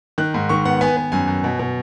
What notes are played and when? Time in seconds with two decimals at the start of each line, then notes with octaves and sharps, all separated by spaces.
0.18 D#3 F#6
0.34 G#2
0.49 D#3 C#6
0.65 B3 F#5
0.81 B3 G#5
0.97 B3
1.12 F#2 G#5
1.28 F#2
1.44 B2
1.59 B2